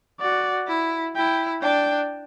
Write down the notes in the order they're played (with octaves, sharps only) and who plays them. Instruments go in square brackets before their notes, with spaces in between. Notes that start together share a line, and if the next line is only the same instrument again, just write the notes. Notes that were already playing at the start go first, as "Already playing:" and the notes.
[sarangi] F#4 [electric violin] D5
[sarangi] E4
[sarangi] E4 [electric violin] G5
[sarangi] D4 [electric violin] G5